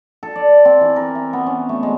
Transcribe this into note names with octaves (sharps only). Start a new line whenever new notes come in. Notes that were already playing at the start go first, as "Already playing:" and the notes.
A4
D5
C4
E3
A#4
E5
B3
C#4
A3
G#3